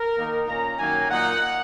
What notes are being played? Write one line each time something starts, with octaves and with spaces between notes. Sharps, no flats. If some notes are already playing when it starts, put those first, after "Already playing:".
Already playing: A#4
D#3 A#3 D#4
A#2 A#3 C#4 A#5
F#2 D#3 F#3 A#3 G#5
A#2 A#3 D#4 F#5